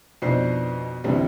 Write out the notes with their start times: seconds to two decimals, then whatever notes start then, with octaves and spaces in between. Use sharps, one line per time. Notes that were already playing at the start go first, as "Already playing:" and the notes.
0.22 F2 B2 D4 D#4 C5 C7
1.04 A#1 E2 D3 G3 C4